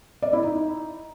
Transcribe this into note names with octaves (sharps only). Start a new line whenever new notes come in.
D5
E4
D#4